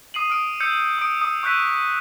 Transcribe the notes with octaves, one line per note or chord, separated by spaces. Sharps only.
D#6 C7 D#7 F#7
D#6 F6 D7
E6 G6 C#7
D#6 D7
D#6
C#6 E6 F#6 G6 B6 D#7